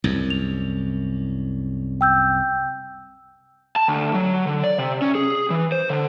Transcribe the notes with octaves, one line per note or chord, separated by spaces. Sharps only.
C2 F#2
F7
G5 E6 G6
A5
D2
F#3
D3
D5
C3
C#4
G#4
E3
C5
D3